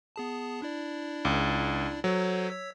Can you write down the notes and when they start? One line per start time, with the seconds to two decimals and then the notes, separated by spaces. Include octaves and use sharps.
0.16 B3 G#4 A5
0.62 D4 E4 D5
1.25 C#2
2.04 F#3 A4 C5 C#5
2.49 C#5 E6 B6